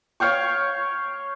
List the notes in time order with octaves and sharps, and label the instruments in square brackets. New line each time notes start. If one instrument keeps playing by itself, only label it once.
[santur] C#5 F5 G5 C#6